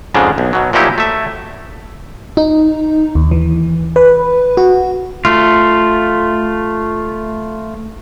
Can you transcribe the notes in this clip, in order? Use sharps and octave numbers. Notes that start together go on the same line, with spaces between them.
F2 G#2 C#3 G#3 D4
B1
B2 F#3
A#2 F3 F#3 D#4 E4 G4
A3 E5
D#4
D#2
E3
B4
F#4
A3 F4